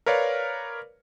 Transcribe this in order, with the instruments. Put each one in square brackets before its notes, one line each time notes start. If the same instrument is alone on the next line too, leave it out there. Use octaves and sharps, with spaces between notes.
[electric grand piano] A#4 B4 C#5 D5 F5